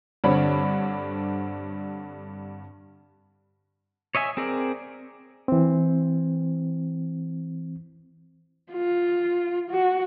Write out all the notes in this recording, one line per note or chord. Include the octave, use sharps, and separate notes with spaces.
G2 D3 C4 D4 C#5 B5
C#5 D#5 E5 G#5
C4 G#4 A#4 D5
E3 C4
F4
F#4